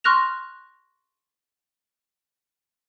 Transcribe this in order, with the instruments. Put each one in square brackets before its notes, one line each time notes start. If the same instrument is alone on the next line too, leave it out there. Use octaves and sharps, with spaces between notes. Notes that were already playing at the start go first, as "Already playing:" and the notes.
[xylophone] C6 C#6 F6 F#6 A#6 F7